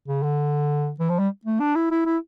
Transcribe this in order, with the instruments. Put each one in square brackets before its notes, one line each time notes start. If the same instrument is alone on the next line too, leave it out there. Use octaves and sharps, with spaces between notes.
[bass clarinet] C#3
D3
E3
F3
G3
A3
D4
E4
E4
E4